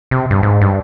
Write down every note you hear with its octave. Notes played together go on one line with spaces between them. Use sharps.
C3
G2
G#2
G2